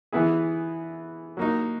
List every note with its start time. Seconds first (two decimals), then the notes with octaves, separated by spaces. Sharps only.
0.12 E3 B3 E4 G#4
1.37 F#3 A#3 D#4